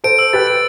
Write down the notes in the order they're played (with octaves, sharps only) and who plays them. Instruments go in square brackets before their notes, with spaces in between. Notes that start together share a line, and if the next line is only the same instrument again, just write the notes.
[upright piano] A4 C5 [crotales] D7
[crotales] E6
[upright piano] G4 B4 [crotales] A6
[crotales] D7